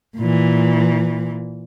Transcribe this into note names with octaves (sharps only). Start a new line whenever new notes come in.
A#2 E3